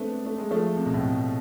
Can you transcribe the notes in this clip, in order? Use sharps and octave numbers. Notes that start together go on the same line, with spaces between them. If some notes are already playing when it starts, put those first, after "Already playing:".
Already playing: G#3 A3 B3 C4 D4
A3
G#3
F3 A3
C3
B2
A2 C3